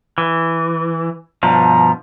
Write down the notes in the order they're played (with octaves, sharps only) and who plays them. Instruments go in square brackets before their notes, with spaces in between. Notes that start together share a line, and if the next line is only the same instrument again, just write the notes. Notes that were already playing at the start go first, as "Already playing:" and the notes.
[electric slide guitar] E3
[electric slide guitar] G2 B2 F3 [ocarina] A#5